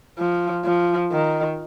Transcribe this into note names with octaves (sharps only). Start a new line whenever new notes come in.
F3
F3
D#3